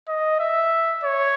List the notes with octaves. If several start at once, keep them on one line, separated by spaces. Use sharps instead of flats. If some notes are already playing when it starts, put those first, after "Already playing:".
D#5
E5
C#5